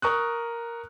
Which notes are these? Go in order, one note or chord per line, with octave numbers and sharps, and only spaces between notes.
A#4 C#6 D#6 F#6